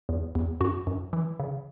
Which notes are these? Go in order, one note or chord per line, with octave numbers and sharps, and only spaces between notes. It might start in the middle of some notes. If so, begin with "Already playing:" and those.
E2
E2
F#2 F#4
F#2
E3
C#3